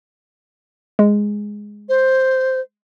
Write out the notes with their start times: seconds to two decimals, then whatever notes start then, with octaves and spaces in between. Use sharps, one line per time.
0.99 G#3
1.89 C5